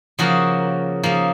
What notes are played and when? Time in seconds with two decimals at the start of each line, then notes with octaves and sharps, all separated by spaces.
0.19 C#3 F3 A#3 F#4
1.03 C#3 F3 A#3